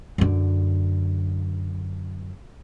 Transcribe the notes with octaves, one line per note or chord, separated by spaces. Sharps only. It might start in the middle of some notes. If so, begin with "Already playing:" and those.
F#2 D3